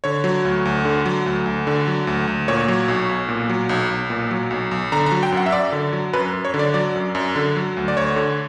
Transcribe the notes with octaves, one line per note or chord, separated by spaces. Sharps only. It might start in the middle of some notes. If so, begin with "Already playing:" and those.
D3 C#5
F#3
D2
D2
D3
F#3
D2
D2
D3
F#3
D2
D2
A#2 C#5
F#3
B1
B1
A#2
F#3
B1
B1
A#2
F#3
B1
B1
D3 A#5
A#5
F#3
G5
F#2 F#5
E5
F#2 D5
D3
F#3
F#2 B4
F#2
C#5
D3
D5
F#3 D5
F#2
F#2
D3
F#3
D2
D5
D2 C#5
D3